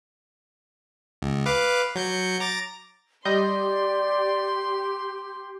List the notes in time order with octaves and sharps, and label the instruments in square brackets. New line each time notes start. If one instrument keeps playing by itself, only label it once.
[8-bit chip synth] C#2
B4 F5 D6
F#3 G6 C#7
A#5 D6 A6
[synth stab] G3 D#5 G6 [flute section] G4 [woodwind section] D5 [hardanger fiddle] C6